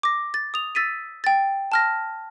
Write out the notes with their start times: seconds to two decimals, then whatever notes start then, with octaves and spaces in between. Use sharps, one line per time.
0.03 D6 A#6
0.34 A6
0.54 D#6 F7
0.75 E6 A6 B6 D#7
1.24 G5 A6
1.72 A5 F6 A#6